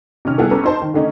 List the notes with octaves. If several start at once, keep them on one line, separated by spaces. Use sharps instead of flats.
C3 D#3 C#4 F6
G3 B3 E4 G#4 A4
C#4 G4 A4 B4 A#5
C4 D#4 C5 A5
D#3
D3 D#3 A3 C#4 D#4